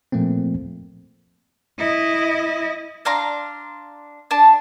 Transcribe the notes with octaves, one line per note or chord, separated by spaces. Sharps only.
A#2 F3 A3 A#3 C4
E4 D#5
D4 F5 A#5 C6
D4 A5